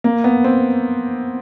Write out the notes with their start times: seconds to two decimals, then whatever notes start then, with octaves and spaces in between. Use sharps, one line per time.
0.04 A#3
0.24 B3
0.44 C4